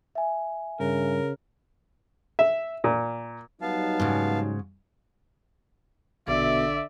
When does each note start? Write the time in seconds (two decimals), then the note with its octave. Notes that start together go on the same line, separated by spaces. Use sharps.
0.15 E5 G#5
0.80 G2 C#3 A#4
2.39 E5
2.84 A#2
3.62 F#3 G3 B3 D#4 F5 A5
4.00 G#2 C#3
6.28 A#1 B2 D3 D5 E5